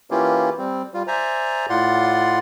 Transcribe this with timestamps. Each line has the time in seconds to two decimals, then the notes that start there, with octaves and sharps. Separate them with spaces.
0.11 E3 A#3 C#4 E4 F4 G4
0.58 G3 C4
0.94 G3 F4
1.08 C5 D5 E5 G#5 A#5
1.70 A2 F4 D5 F#5 C6